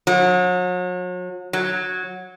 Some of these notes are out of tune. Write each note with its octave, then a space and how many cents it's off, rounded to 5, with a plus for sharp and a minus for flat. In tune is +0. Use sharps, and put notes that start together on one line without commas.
F#3 -40
F#3 -10